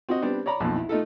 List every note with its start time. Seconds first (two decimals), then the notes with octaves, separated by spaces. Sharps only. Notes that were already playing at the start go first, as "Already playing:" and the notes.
0.09 C4 F#4 D#5
0.22 G3 B3 C4 D4
0.46 C#5 D5 A#5 B5
0.60 B1 F2 A#2
0.76 E4
0.89 A3 D#4 F4 A4